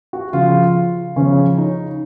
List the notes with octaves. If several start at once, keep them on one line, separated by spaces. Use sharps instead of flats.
F#4
C#3 F3 F4
C#3 F3 C#4
D#4